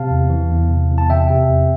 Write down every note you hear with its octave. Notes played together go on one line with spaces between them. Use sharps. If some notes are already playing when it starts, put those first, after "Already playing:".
Already playing: C3 F5 A5
E2
E3
E2
C3
E2
A5
C3 E5 G5
C3
E2